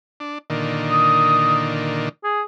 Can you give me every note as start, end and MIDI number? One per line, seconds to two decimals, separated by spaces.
0.20 0.38 62
0.50 2.09 46
0.50 2.09 50
0.50 2.09 51
0.90 1.74 87
2.24 2.41 68